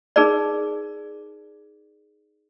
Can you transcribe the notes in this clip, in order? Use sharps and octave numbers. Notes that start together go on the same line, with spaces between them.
D#4 G#4 A#4 B4 D5